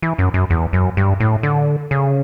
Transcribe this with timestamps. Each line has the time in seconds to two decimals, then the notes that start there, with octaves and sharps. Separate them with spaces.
0.02 E3
0.18 F#2
0.34 F#2
0.50 E2
0.73 F#2
0.97 G2
1.20 A2
1.43 D3
1.91 C#3